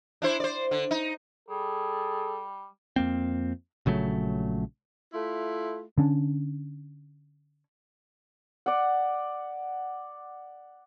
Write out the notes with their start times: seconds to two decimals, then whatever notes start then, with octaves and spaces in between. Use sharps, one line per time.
0.22 D4 E4 C5
0.40 C5 D5
0.71 D3
0.91 D#4
1.49 G3 G#4 A4
2.96 F2 A#3 C4
3.86 A#1 C#3 F#3 A3
5.11 A3 E4 F4
5.98 D3 C#4 D4
8.66 D5 F#5